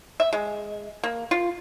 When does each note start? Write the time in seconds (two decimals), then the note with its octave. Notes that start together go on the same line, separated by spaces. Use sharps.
0.20 E5
0.33 G#3
1.04 A#3
1.31 F4